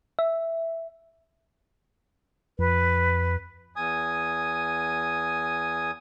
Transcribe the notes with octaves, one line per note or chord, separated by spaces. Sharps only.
E5
F2 B4
E2 G#5 D#6